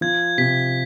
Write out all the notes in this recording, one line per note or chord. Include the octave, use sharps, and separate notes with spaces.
F3 G#6
C3 B6